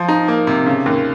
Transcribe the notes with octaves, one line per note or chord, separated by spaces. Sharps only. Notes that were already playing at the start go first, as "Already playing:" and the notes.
Already playing: F3
D#4
A#3
C3
C#3
D#2